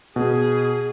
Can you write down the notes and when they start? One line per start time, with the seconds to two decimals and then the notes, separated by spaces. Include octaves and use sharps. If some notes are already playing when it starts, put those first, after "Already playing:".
0.16 B2 G#4